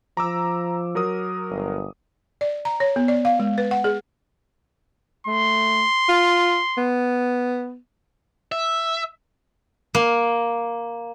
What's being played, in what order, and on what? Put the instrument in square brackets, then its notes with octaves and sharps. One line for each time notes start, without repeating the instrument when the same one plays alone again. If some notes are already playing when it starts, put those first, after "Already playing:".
[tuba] F3 [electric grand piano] A#5 D6 E6
[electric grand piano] F#3 A#4 D#6
[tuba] G1
[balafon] D5
A#5
C#5
B3
D5
F5
G#3
B4
F#5
G#4
[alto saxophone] A3 [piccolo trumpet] C6
[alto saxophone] F4
B3
[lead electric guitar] E5
[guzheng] A#3